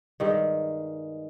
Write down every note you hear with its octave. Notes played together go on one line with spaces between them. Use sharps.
G2 D#3 G#3